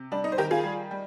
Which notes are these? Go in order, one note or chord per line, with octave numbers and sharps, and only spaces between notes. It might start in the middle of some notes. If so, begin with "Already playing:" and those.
Already playing: C3
G3 D4
D#4
C5
D#3 G4 A#4
F4 G#4
G3
G3